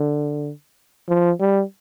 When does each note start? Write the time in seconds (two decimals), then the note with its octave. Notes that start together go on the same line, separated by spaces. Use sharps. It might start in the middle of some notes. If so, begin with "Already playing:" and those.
Already playing: D3
1.09 F3
1.40 G3